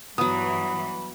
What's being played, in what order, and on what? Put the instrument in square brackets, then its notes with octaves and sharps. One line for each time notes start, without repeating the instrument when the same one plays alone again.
[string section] G2 E3 [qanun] F#3 B3 [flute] B5 [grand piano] D#6